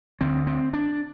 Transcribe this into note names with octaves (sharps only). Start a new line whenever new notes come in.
D2 D3 C4
C4
D4